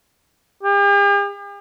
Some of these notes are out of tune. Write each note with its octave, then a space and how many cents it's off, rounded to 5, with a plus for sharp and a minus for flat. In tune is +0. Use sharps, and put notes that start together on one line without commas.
G4 +45